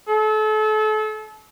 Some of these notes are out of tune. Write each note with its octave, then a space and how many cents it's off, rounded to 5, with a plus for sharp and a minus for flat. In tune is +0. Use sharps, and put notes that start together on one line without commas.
A4 -35